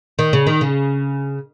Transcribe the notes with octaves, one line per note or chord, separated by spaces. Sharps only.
D#3
C#3
D#3
C#3